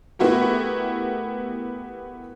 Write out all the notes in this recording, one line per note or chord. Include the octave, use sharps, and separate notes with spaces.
A3 B3 E4 F#4 G4 A#4